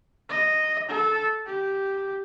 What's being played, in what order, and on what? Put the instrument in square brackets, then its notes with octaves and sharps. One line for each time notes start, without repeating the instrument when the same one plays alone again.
[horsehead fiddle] D#5
A4
G4